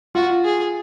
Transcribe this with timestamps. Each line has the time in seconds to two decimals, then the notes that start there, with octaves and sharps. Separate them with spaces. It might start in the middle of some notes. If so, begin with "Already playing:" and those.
0.15 F4 F#4
0.44 G#4